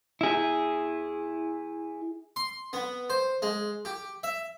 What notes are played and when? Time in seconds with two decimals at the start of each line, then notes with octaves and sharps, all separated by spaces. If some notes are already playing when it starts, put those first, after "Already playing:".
0.21 E4 G#4
2.36 C6
2.73 B3
3.10 C5
3.42 G#3
3.85 G4
4.23 E5